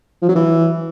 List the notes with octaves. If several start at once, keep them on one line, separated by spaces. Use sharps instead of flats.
F3
F#3
E3